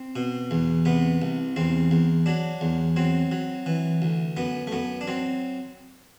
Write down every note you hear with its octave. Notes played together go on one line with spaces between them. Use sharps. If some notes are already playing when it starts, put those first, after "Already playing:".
Already playing: C4
B2
E2
C3 B3
C2
E2 C4
E2
F#3 D4
E2
F#3 C4
F#3
E3
D2
F#2 B3
A3
F#2 B3
D4
F#3 C4